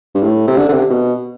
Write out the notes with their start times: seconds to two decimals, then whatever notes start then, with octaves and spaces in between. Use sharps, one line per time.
0.15 G2
0.23 A2
0.47 C3
0.57 D3
0.69 D3
0.73 C3
0.90 B2